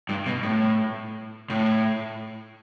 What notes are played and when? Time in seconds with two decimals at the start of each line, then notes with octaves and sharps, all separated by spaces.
0.09 G2
0.26 B2
0.43 A2
1.50 A2